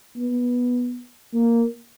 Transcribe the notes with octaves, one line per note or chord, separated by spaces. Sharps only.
B3
A#3